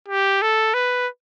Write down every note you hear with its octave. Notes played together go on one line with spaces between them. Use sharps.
G4
A4
B4